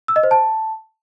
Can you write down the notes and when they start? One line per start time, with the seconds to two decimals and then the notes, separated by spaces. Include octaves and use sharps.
0.08 E6
0.16 D#5
0.23 C5
0.31 A5